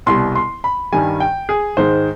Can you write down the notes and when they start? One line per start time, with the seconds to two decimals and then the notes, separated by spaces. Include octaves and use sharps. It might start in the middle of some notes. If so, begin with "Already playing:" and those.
0.06 C2 B2 G3 C6
0.35 C6
0.64 B5
0.93 G2 D#3 G3 G#5
1.20 G5
1.49 G#4
1.77 G#2 D#3 G#3 C5